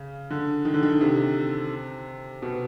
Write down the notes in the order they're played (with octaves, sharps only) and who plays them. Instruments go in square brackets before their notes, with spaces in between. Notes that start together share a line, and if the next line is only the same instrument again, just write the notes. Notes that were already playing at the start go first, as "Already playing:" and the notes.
Already playing: [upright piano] C#3
D3
D#3
D3
D#3
C3
B2